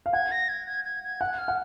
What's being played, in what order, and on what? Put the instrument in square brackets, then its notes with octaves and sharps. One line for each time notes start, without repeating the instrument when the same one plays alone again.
[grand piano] F5
[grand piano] F#5 [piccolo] G#6
[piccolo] A#6
G#6
G#6
G#6
G#6
[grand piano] F#5 [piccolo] F#6
[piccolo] F6
[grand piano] F#5